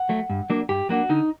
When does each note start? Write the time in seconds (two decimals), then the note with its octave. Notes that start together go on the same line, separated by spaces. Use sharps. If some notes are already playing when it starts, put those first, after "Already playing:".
Already playing: F#5
0.09 F#3 A3
0.30 G2
0.50 F#3 A#3 D4
0.69 G2 G4
0.89 F#3 A#3 D4 F#4
1.09 D3 D#4